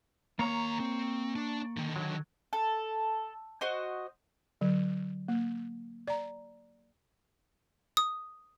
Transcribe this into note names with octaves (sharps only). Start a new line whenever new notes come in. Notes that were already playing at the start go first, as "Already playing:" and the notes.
D#2 A#3 C#5 A#5
C4
D4 D5
D3 D#3
F#3
A4
F#4 C5 D#5
D3 F#3
A#3
D5 A#5
D#6